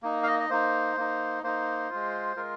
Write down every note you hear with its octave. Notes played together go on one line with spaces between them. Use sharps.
A#3 D#4
F5
D#5
D#5
A#3 D#4 C5
A#3 D#4
A#3 D#4 C5
G#3 F4
G#3 F4 A#4